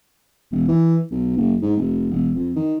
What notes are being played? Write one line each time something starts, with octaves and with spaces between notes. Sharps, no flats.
E1
E3
B1
F#1
G#2
F1
E1
F2
D#3